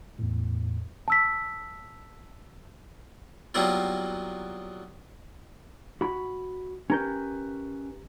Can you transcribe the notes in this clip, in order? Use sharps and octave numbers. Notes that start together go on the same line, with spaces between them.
E2 A2
A5 E6 B6
F#3 G3 A#3 B3 E4 F4
F#4 B5
C#4 G4 A#4 B4 A#5 G6